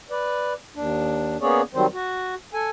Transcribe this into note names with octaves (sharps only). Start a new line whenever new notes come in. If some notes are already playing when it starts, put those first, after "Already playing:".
B4 D5
D#2 D4
A#3 B3 C#4 G#4 C#5 D5
D#3 F#3 G3 C4 C5
F#4
A4 G#5